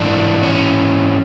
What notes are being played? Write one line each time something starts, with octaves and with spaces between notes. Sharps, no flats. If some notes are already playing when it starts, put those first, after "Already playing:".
Already playing: G#2 E3 D4
C#4